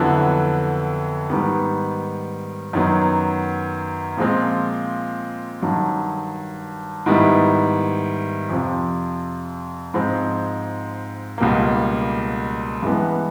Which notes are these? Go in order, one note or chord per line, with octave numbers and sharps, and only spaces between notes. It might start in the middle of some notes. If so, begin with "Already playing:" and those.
Already playing: F2 D3 F#3 B3 E4
G#2 D#3 G3 B3
F#2 D#3 F#3 B3
A#2 F3 G#3 C4 F4
G2 D#3 F#3
G#2 D#3 G3 B3 E4
F2 C3 F3
G#2 F3 G#3 C4
C#2 B2 G3 A#3
G2 E3 G#3 B3